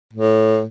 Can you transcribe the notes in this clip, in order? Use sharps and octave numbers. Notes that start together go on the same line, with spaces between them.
A2